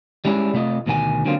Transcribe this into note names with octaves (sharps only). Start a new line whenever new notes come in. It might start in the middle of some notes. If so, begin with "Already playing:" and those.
G3 G#3 C#4 E4 F#4 G#4
C3 A3 F4 D#5
D2 B2 D#3 G5 G#5
D3 F#3 A#3 C4 F4